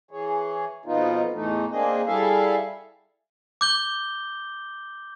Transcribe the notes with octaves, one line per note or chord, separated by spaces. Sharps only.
E3 G#4 C#5
F2 B2 B3 D#4 F4
E2 A2 E3 A3 D#4
A#3 C4 D4 G#4 D#5
G3 E4 G#4 A4 E5 F5
D6 G6 G7